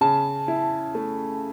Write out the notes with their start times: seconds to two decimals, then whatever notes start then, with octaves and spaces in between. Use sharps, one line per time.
0.01 C#3 A5
0.48 E4
0.95 A3